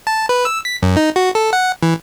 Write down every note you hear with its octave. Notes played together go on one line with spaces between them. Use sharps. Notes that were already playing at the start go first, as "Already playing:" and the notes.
A5
B4
E6
B6
F#2
D#4
F#4
A4
F#5
E3